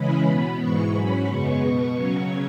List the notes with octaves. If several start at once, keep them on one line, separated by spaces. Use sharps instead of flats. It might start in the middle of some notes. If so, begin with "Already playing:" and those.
Already playing: C#3 E3 G#3 C#4 B5
B2 B3
G#2 E3 G#3 C#6
G#2 F#3 C#4 B5
F#2 C#3 G#3 B3 C#6
B2 B3 C#6
C#3 F#3 C#4